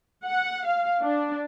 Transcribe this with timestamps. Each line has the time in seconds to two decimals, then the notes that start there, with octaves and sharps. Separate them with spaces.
0.25 F#5
0.65 F5
1.02 D4